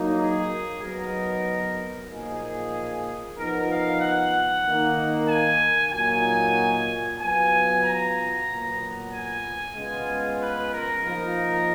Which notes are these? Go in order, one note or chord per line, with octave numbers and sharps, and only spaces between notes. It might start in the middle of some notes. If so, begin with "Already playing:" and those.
Already playing: F#3 A#3 D#4
G#4
F#3 B3 D#4 A#4
A#2 F3 A#3 D#4 G#4
F3 B3 D#4 A#4
F5
F#5
D#3 A#3 D#4
G#5
A#2 F#3 A#3 D#4 G#5
F#3 B3 F4 G#5
A#5
A#2 F#3 B3
G#5
C#3 G#3 B3 F4
B4
A#4
F3 A#3 D#4